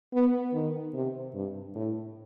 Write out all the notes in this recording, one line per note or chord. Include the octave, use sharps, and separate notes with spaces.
B3
D#3
C3
G2
A2